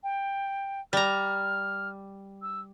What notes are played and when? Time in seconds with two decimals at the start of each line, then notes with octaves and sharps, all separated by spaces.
0.03 G5
0.93 G3 A#5 F6
2.42 E6